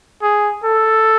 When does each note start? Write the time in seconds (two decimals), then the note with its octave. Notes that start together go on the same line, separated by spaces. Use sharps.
0.22 G#4
0.64 A4